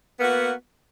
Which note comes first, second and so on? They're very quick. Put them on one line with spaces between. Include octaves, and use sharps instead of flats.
B3 A#3 F#4